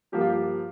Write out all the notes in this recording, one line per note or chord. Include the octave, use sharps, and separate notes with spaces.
G2 F3 A#3 G4
F4
G4